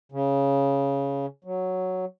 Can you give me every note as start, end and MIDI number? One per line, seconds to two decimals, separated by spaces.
0.12 1.26 49
1.44 2.05 54